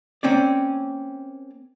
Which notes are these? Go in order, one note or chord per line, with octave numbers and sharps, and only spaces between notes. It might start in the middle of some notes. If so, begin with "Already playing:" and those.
A#3 C4 C#4 D5